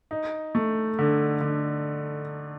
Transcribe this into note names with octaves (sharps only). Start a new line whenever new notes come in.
D#4
A3
D3
D3